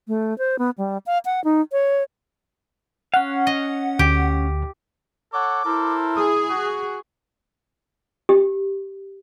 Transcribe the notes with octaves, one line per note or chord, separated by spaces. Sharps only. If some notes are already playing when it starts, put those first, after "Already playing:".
A3
C5
B3
G3
F5
F#5
D#4
C#5
C#4 F5 F#5
D#5
D2 G4
A4 C#5 F#5 D6
E4 A4 A#4 C5
G#4 D#6
F#4
G4